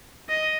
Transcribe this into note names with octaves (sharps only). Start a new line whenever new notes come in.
D#5